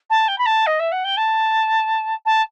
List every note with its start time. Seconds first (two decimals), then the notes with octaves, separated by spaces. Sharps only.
0.10 A5
0.28 G5
0.38 B5
0.46 A5
0.67 D#5
0.80 E5
0.92 F#5
1.04 G5
1.17 A5
2.26 A5